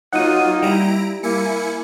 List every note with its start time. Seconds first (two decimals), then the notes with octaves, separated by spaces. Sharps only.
0.13 F#3 A#3 D#4 F4 F#5 D#6
0.62 G3 E4 A#5 D7
1.23 A#3 E4 G#5 C#7